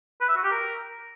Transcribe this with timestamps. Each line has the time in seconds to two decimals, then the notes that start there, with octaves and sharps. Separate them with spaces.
0.21 B4
0.28 E5
0.36 F#4
0.44 G4
0.52 A#4